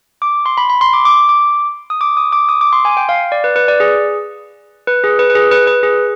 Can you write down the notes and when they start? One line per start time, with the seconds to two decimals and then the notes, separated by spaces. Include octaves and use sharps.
0.22 D6
0.46 C6
0.57 B5
0.70 B5
0.81 C6
0.93 D6
1.05 D6
1.29 D6
1.90 D#6
2.01 D6
2.17 D#6
2.32 D6
2.49 D#6
2.61 D6
2.73 C6
2.85 G#5
2.97 G5
3.09 F5
3.32 D5
3.44 B4
3.56 B4
3.68 D5
3.80 G#4
4.87 B4
5.04 G#4
5.19 B4
5.30 B4
5.35 G#4
5.51 B4
5.67 B4
5.83 G#4